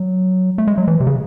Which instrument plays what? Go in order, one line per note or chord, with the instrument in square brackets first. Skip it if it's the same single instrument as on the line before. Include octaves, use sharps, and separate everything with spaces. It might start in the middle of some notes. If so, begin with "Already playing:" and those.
Already playing: [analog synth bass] F#3
A3
G#3
F#3
E3
C3
C#3